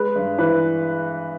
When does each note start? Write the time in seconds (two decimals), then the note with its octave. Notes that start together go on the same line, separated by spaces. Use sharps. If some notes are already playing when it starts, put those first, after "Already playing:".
Already playing: G#3 B4
0.16 G2
0.38 E3 B4